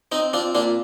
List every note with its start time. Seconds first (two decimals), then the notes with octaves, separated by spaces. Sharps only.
0.12 C4 D#4
0.33 C4 D4 F4
0.55 A#2 D4 F4